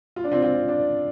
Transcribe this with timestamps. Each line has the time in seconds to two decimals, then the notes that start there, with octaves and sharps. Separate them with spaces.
0.16 F4
0.24 D4
0.32 C4 F4
0.42 C4 F4
0.68 D4